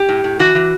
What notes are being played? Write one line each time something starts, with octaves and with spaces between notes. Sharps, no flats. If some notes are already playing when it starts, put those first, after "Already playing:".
Already playing: G4
A2
A2
E3 F#4
E3